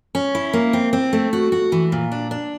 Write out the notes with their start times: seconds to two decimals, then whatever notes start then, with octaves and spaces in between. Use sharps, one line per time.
0.15 C#4
0.35 E4
0.53 A#3
0.73 C4
0.93 C4
1.13 A3
1.33 F#4
1.52 F#4
1.72 E3
1.92 A#2
2.12 D4
2.31 D4